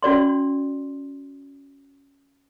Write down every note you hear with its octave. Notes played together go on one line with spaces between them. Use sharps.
C#4 F#4 D5 C6